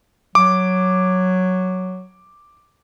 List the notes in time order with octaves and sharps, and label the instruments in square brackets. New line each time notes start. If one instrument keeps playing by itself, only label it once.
[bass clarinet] F#3 [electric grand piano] D6